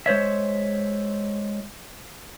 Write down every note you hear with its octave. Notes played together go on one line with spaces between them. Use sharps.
G#3 C5 C#5 E5